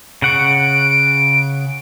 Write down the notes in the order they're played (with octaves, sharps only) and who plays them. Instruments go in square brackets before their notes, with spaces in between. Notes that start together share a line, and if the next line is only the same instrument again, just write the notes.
[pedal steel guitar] C#3 F#5 C#6 [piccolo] D7